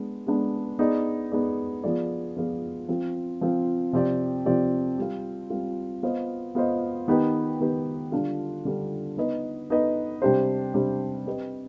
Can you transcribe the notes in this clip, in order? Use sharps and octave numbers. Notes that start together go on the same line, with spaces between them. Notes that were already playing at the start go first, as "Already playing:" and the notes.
Already playing: G#3 B3 D4
G#3 B3 D4
B3 D#4 G#4 D5
B3 D#4 G#4 D5
F3 B3 F4 G#4 D5
F3 B3 F4 G#4 D5
F3 C4 F4
F3 C4 F4
C3 F3 C4 G4 D5
C3 F3 C4 G4 D5
G3 C4 F4
G3 C4 F4
B3 F4 C5 D#5
B3 F4 C5 D#5
D#3 B3 D#4 G4 B4
D#3 B3 D#4 G4 B4
D3 G3 D4 F4
D3 G3 D4 F4
B3 D#4 B4 D#5
B3 D#4 B4 D#5
C3 G3 D4 G4 C5
C3 G3 D4 G4 C5
C4 G4 B4 D#5